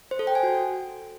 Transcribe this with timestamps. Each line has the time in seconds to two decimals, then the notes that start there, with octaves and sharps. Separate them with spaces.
0.11 C5
0.19 A4
0.27 G5
0.35 G#5
0.43 F#4